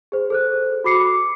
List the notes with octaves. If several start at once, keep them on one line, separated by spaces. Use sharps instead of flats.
G#4 C5
A4 C5 F#6
F#4 B5 D6 C7 C#7
D6